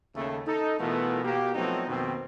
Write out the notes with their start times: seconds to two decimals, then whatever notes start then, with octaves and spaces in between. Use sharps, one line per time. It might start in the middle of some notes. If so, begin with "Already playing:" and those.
0.15 D#2 C#3 A3
0.47 D#4 A4
0.79 B2 E3 A3 B3 F4 A#4
1.24 B2 A#3 G4
1.55 F3 F#3 A3 B3 C4 D#4
1.88 F2 B2 D#3 A#3 C4